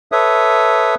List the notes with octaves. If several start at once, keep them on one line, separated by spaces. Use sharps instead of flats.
A4 B4 C#5 E5 D#6